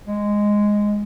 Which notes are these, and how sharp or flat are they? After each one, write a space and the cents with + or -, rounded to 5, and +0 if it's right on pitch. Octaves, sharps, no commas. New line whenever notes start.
G#3 -5